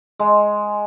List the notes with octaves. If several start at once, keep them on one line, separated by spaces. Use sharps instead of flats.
G#3